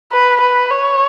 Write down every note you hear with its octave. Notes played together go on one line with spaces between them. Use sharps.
B4
B4
C#5